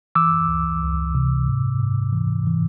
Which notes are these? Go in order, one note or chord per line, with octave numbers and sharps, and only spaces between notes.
E3 D6 E6
C#2
C#2
C3
G#2
G#2
E3
E3